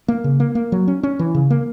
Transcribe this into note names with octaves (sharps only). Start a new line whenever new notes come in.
A#3
C#3
A#3
A#3
F#3
C#4
C#4
E3
C#3
A#3